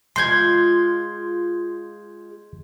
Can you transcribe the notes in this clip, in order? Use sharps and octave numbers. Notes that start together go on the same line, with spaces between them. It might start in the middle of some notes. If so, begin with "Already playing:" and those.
G#3 F4 C6 G6 G#6